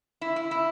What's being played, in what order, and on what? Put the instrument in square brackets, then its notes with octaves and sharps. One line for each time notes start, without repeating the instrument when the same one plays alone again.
[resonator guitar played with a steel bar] E4
E4
E4